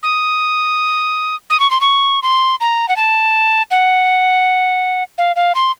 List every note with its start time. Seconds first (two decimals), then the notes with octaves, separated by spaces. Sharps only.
0.03 D#6
1.50 D#6
1.60 C#6
1.71 C6
1.81 C#6
2.22 C6
2.60 A#5
2.89 F#5
2.96 A5
3.71 F#5
5.18 F5
5.36 F5
5.55 C6